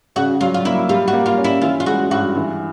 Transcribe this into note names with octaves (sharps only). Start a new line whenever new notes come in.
C#3 F#4
F#3 F4
F4
A#3 E4
G3 F4
F#4
A#3
F4
C#4
E4
E3 F4
F4
G#3 F#4
G2 F#4
E3